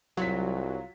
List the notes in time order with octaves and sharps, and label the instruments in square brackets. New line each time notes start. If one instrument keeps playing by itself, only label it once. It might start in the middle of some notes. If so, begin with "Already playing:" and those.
[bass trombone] C2 [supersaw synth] F#3 [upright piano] F4 B6